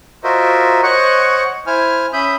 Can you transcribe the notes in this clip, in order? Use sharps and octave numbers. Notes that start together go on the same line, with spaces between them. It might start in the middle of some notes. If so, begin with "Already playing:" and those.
F4 F#4 A#4 C5 D#5 E5
C5 C#5 D#5 F#5 C#6 F#6
E4 C5 G#5 F6
C#4 E5 B5 D#6 G6